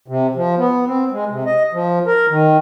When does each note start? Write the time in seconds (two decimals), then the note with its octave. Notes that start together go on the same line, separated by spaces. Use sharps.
0.08 C3
0.36 F3
0.58 B3
0.87 C4
1.12 G#3
1.30 C3
1.46 D#5
1.73 F3
2.07 A#4
2.30 D#3